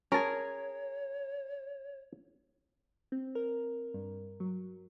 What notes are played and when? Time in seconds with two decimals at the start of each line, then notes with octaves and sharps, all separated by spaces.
0.12 C#4 G#4 A#4 C#5 A5
3.12 C4
3.35 A#4
3.94 G2
4.40 F#3